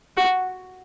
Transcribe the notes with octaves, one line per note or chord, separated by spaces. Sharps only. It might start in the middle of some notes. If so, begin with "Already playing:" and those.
F#4